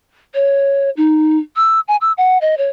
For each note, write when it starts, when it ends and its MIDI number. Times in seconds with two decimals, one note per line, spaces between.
0.34 0.90 73
0.97 1.37 63
1.56 1.80 88
1.88 1.96 80
2.01 2.12 88
2.18 2.38 78
2.42 2.58 75
2.58 2.70 73